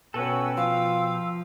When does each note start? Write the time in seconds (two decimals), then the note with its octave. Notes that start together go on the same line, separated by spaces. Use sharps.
0.14 B2 C#4 F#4 A4 B4 G5 E6
0.57 F3 F4 F5